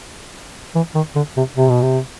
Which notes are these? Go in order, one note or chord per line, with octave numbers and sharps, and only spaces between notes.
E3
D#3
D3
C3
C3
B2
C3